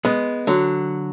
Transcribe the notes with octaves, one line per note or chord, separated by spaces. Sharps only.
G#3 B3
D3 F#3